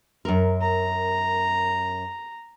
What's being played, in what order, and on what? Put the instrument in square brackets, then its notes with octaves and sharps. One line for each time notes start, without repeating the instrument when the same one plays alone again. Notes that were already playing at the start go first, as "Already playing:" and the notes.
[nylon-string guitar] F#2 A#4
[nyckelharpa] A#5